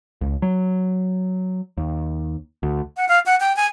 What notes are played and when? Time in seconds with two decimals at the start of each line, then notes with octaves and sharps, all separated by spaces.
0.21 C#2
0.42 F#3
1.77 D#2
2.63 D2
2.97 F#5
3.09 F5
3.26 F#5
3.40 G5
3.56 G#5